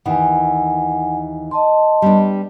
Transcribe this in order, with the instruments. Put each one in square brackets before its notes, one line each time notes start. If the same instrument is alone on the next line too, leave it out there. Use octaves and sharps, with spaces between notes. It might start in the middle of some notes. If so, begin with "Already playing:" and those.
[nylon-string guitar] D#2 D#3 E3 [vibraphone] F#5 G#5
[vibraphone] D#5 A5 C6
[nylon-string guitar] G3 B3 D4